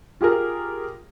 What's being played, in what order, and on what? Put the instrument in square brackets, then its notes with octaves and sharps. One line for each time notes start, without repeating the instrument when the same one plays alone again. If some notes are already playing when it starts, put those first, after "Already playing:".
[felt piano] F4 G4 G#4 A#4